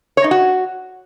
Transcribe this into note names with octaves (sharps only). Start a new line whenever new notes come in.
C#5
D#4
F#4